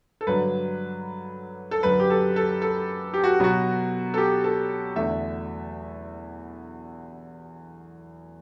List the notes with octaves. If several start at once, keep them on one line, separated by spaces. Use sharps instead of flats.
A4
G2 D3 F#3 B4
A4
F#2 D3 F#3 B4
G4
A4
A4
A4
G4
F#4
B2 F#3 B3 F#4
A4
G4
A4
E2 D3 A3 E5